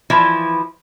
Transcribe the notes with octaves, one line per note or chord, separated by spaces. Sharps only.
E3 F3 E4